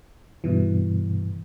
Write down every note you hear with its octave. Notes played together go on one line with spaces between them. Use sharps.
G2 B2 E3